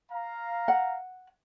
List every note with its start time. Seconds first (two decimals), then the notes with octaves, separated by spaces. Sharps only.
0.12 F5 A#5
0.68 F#5